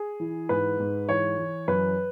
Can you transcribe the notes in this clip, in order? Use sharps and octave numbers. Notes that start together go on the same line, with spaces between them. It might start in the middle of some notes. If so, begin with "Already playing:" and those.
Already playing: G#4
E3
G#2 B4
G#2
E3 C#5
E3
F#2 B4